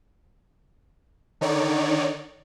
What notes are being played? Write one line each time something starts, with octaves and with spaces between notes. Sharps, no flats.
D3 D#3 D#4 C#5 D5